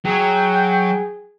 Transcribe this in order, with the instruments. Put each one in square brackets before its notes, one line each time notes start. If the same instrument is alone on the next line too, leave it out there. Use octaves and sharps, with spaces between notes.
[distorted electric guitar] F#3 [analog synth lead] G#4 [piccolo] G5